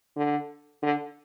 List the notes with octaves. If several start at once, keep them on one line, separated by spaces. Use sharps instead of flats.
D3
D3